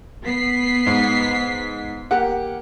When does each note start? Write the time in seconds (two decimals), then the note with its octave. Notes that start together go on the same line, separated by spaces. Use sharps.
0.24 B3 B6 C7
0.86 G#2
2.11 A#3 G4 F#5